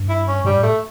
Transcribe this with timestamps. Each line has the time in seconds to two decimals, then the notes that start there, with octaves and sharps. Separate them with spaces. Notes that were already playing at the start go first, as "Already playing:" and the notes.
Already playing: G2
0.09 E4
0.28 C#4
0.45 G2 G3
0.57 A2
0.63 A3